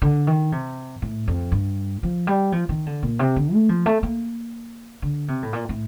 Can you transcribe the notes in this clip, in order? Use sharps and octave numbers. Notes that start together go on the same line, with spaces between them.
D3
D#3
C3
A2
F2
G2
F3
G3
F3
D#3
D3
A#2
C3
D3
A3
F3
A3
A#3
D3
C3
A2
A#2
A2